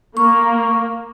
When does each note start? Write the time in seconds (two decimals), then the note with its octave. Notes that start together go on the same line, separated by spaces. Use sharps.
0.17 A#3 C#6